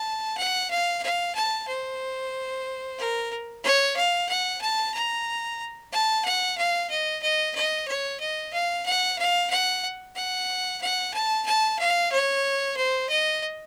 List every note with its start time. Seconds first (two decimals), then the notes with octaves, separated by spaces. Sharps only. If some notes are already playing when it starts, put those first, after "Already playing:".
Already playing: A5
0.37 F#5
0.71 F5
1.03 F5
1.35 A5
1.68 C5
2.98 A#4
3.64 C#5
3.96 F5
4.29 F#5
4.61 A5
4.94 A#5
5.92 A5
6.25 F#5
6.57 F5
6.90 D#5
7.23 D#5
7.55 D#5
7.88 C#5
8.20 D#5
8.53 F5
8.85 F#5
9.18 F5
9.50 F#5
10.16 F#5
10.82 F#5
11.14 A5
11.46 A5
11.79 F5
12.12 C#5
12.77 C5
13.09 D#5